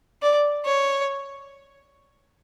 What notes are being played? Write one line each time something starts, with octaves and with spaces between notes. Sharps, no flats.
D5
C#5